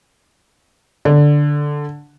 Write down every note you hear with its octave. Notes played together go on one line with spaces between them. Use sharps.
D3